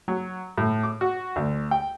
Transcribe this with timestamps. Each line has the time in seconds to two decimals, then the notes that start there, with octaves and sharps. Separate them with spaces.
0.08 F#3
0.58 A2
0.83 D6
1.01 F#4
1.36 D2
1.71 G5